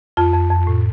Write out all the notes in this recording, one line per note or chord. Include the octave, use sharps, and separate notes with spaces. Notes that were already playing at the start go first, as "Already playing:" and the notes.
F2 F4
F2
F2
A2